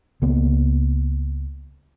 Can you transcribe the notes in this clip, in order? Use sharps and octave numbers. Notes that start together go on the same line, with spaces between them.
C#2 A#3 B3